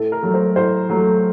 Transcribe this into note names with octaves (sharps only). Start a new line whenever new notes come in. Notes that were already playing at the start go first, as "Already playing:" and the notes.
Already playing: A2 A4
A#4
F#3 A3
C5
A2 C5
F#3 A3